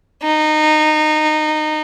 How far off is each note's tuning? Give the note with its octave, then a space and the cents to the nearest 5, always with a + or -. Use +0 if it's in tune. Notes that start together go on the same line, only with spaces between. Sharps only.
D#4 -20